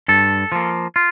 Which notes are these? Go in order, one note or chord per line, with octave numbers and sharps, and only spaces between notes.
G2 A4
F3 A#3
F4